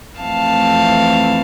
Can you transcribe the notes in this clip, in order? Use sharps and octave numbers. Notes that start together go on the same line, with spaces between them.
F2 E3 A3 C4 F5 A5